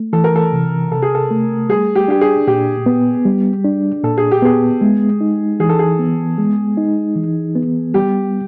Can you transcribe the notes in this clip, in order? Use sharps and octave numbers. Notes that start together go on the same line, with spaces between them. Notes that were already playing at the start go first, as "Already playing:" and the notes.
Already playing: A3
E3 A4
A#4
A4
C3
C3 A4
G#4
A4
A3
G3 G#4
G4
D4 G4
G#4
A#2 G4
B3
G3
D4
A#2 A4
G#4
G4
B3 G#4
G#3
D#4
E3 G#4
A4
G#4
B3
G#3
D#4
E3
B3
G3 G4